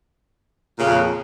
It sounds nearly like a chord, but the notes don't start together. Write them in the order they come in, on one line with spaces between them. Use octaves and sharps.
A#2 C#3 F2